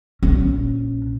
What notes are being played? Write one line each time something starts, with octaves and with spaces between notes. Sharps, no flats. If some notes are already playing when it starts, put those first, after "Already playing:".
A#1 C#4